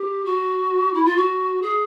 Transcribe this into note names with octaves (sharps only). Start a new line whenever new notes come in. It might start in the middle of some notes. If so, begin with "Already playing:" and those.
Already playing: G4
F#4
E4
F4
F#4
G#4